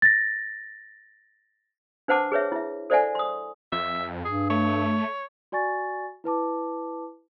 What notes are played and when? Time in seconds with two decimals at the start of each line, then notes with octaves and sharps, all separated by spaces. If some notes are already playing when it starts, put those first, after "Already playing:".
0.02 A6 A#6
2.08 D4 B4 C5 F#5 A5 D6
2.32 G#4 B4 C#5 E5
2.52 E4 E5
2.90 A4 C5 D5 E5 F#5 G#5
3.15 C6 D#6
3.72 F2 E5
4.25 G2 G#4
4.50 A3 C#5
5.52 F#4 D5 G#5 C#6 A6
6.24 E4 B4 A5 D6